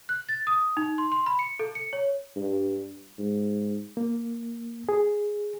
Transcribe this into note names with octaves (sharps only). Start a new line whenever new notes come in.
F#6
A6
D#6
D#4
C6
C6
B5
C#7
A4
C#7
C#5
G2
G#2
A#3
G#4